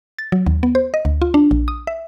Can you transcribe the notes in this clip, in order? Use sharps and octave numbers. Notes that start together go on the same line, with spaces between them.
A6
F#3
D#2
B3
C5
D#5
D2
F4
D4
A#1
D#6
E5